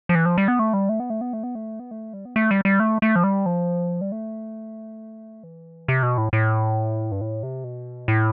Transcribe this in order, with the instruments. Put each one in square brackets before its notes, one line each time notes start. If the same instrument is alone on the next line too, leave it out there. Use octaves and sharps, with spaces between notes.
[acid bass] F3
E3
F3
G3
B3
A3
G3
A3
B3
A3
B3
A3
B3
A3
B3
A3
G3
B3
A3
G3
G3
A3
A3
F3
G3
F3
G3
A3
E3
C3
B2
A2
A2
G2
A2
C3
B2
A2